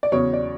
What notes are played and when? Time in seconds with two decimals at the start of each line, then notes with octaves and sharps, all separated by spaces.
0.03 D5
0.12 E2 C#3 F#3 C#5
0.33 D5